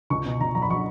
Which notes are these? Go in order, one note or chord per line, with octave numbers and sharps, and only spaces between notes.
C#2 C#6
B2
C#2 A#5
F#3 A#5
B5
F#3 C#6